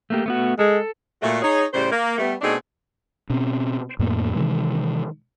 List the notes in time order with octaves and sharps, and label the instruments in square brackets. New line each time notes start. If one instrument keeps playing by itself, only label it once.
[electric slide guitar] A3 A#3 G4
A3 B3 F#4
[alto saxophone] G#3 [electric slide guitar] A4
[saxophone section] A#2 A3 F#4
D#4 G#4 C#5
A2 C#3 G3 C5
A#3
G3 A3 B3
B2 A3 C4 D4 D#4 G#4
[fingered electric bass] B2 C4 C#4
F2 A2 A#3 B3
C3 D#3 E3 G#3